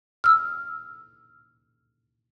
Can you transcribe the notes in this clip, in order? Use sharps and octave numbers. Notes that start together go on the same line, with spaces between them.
E6 F6